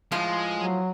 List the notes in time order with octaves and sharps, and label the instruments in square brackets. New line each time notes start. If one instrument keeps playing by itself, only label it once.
[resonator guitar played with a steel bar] A2 F3 F4 [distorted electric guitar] G#3
[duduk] F#3